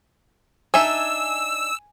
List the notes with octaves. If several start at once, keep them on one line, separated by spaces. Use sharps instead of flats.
D4 D#4 E5 G#5 E6